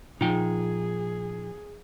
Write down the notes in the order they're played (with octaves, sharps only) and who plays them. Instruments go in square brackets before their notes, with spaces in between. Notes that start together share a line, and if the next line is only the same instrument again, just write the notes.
[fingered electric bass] A#2 F3 [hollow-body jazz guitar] D#4 F4 G5 [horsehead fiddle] G#4